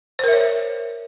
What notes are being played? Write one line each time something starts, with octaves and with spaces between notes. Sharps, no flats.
A#4 C5 C#5 E5